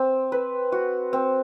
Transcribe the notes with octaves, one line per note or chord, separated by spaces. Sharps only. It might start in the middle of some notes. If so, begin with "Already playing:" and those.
Already playing: C4
B4
F#4
C4